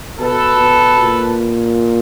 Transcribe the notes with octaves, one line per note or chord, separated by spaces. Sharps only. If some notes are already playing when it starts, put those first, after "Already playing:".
B2 A4 B4
B2
A#2